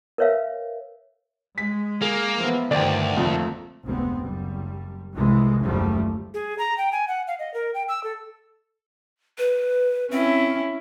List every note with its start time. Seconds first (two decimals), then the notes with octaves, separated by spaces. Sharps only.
0.18 A#4 B4 C#5 E5 F5
1.58 G#3 B6
2.02 A#3 G#4
2.36 E3 F3 B3
2.71 D2 G2 D#3 F3 D5 G5
3.17 G#1 F2 F3 A3 A#3
3.86 F1 D2 G#3 B3 C4
4.21 F#1 G3
5.16 C2 C3 E3 F3 G#3
5.65 F#1 D#2 F3 G3 A3
6.34 G#4
6.58 A#5
6.78 G5
6.92 G#5
7.08 F#5
7.27 F5
7.39 D#5
7.54 A#4
7.74 G5
7.89 E6
8.04 A4
9.38 B4
10.11 C4 C#4 E4